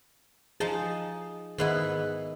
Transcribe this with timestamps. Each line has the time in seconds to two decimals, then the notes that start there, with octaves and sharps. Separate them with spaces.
0.60 F3 D#4 G#4 A5
1.58 G#2 D#3 B3 E4 D#5